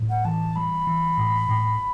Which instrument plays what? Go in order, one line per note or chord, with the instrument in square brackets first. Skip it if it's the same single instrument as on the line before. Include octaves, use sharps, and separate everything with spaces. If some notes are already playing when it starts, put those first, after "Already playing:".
Already playing: [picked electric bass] A2 G3
[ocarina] F#5
[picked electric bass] E3 [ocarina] A5
[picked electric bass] G3 [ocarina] B5
[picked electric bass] E3
A2
A2